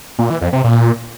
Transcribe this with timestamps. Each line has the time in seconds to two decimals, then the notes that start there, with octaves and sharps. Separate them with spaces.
0.19 A#2
0.30 E3
0.41 F2
0.53 C3
0.64 A#2